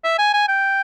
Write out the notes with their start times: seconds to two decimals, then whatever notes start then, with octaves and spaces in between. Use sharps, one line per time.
0.04 E5
0.18 G#5
0.34 G#5
0.48 G5